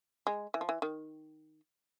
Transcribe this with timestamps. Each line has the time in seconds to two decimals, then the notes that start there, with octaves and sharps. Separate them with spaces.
0.27 G#3
0.54 E3
0.61 F3
0.69 E3
0.82 D#3